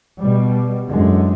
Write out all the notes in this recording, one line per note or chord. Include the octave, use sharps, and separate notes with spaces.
B2 G3
F#2 D3 E3 G#3